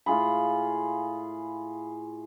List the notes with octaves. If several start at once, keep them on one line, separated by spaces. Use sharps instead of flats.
A2 F4 G#4 B5